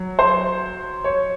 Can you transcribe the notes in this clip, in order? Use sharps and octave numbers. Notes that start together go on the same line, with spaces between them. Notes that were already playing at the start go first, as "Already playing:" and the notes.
Already playing: F#3
C5
C#5